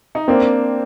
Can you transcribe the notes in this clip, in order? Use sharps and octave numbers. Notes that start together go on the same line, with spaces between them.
D#4
A#3 C4 D4